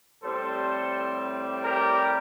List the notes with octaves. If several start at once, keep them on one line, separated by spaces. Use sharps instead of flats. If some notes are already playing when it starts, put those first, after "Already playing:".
A2 G3 C4 A4 C5
G4 A#4